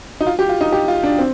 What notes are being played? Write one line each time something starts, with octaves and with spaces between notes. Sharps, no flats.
D#4
F4
G4
F4
D#4
G4
F4
D4
C4